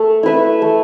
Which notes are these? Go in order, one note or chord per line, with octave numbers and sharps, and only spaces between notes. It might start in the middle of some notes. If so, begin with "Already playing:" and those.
Already playing: A3
E4 B4 E5
A3